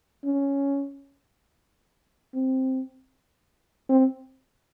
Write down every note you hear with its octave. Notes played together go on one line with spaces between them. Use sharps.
C#4
C4
C4